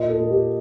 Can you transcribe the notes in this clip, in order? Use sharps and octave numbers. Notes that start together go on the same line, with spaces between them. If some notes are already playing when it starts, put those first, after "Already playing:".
Already playing: A#2 D#5
A4
A#2
G4